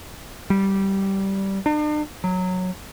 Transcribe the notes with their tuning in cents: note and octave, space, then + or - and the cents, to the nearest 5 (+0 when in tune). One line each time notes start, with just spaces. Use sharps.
G3 -10
D4 +45
F#3 -10